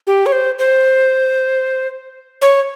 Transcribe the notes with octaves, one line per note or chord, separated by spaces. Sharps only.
G4
C#5
C5
C5
C#5